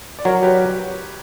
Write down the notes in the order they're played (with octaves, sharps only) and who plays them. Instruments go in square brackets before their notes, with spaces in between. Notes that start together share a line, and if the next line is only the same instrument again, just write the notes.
[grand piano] D5
[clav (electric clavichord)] F#3 [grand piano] A#4 C#5
[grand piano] G4 B4